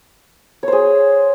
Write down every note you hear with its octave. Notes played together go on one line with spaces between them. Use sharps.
G#4 C5 C#5